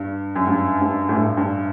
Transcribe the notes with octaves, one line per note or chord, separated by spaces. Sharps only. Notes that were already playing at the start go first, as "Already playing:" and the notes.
Already playing: G2
F#2
G2
G2
A2
G2
G2